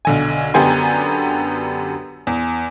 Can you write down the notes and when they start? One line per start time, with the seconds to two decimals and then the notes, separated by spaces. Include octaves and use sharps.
0.05 B1 D3 G#5
0.54 F#2 D3 B3 G4 G#5 C6
2.27 E2